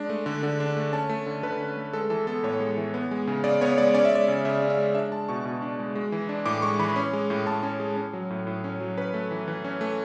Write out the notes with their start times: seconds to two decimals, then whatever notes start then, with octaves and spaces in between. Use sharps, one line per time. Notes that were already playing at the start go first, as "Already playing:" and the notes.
Already playing: G#3 D4
0.10 A3
0.26 D3
0.43 D3
0.60 D4
0.77 A3
0.93 C#4 A5
1.09 A3
1.26 D3
1.43 D3 B4
1.61 C#4
1.77 A3
1.93 G#3 A4
2.10 E3 A4
2.27 B3 A4
2.43 A2 C#5
2.60 G#3
2.77 E3
2.94 B3
3.11 G#3
3.27 C#3
3.44 C#3 D5
3.61 B3 C#5
3.78 G#3 D5
3.94 C#4 D5
4.05 E5
4.11 G#3 D5
4.28 C#3
4.45 C#3 E5
4.62 C#4
4.70 E5
4.78 G#3
4.95 D4 E5
5.12 G#3 A5
5.29 B2 C#6
5.45 B2
5.62 D4
5.79 G#3
5.95 G#3
6.12 E3
6.29 D4
6.46 A2 D6
6.62 G#3 C#6
6.79 E3 B5
6.96 C#4
7.13 G#3
7.30 A2
7.47 A2 A5
7.63 C#4
7.80 G#3
7.97 C#4
8.13 F#3
8.30 A2
8.47 A2
8.64 C#4
8.80 F#3
8.97 C#4 B4
9.14 A3
9.31 E3
9.48 E3
9.65 C#4
9.81 A3